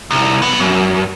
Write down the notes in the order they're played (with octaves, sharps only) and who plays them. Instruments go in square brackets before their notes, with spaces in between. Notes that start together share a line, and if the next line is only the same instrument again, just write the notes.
[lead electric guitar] C2
B1 B3
F#2